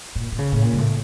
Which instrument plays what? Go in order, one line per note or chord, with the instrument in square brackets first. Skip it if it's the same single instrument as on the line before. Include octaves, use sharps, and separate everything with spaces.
[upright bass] A#2
A#2
C#3
A2
A#2
G2
A2